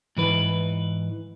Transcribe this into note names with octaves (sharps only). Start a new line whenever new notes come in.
G#2 E3 B4